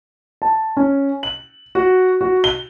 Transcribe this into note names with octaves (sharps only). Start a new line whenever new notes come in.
A5
C#4
F#7
F#4
F#4
G7